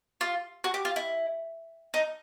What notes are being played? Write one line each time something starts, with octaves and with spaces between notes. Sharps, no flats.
F4
F#4
G4
F4
E4
D#4